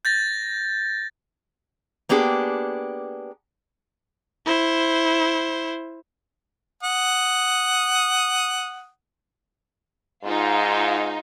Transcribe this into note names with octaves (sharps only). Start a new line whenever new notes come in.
G6 A6 A#6
A#3 B3 D4 G4 G#4
E4 C5
F#5 D#6
G#2 D#4 F4